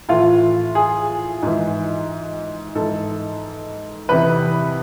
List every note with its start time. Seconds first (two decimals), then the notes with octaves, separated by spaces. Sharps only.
0.08 A2 E3 F4
0.75 G#4
1.42 G#2 E3
2.75 G#2 E3 A4
4.09 E2 C3 E3 B4